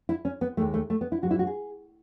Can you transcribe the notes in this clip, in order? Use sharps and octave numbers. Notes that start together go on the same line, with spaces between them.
E4
C#4
B3
D#2 D#3 G#3 A3
A3
A3
B3
E4
G#2 F#3 F#4
E4
F#4
G#4